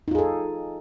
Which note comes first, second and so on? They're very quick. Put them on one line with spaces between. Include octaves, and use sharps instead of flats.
D#4 F4 G#4 A4